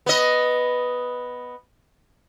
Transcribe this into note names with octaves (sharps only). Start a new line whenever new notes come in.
B3 D#5